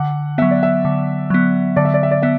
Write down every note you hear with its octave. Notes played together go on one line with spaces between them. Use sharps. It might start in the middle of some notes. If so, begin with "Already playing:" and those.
Already playing: D3 F#5
F#3 B3 E5
D5
E5
D3
F#3 B3
D3 D5
E5
D5
E5
D5
B3 E5